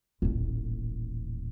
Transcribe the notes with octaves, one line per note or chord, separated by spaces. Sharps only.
D#1 A1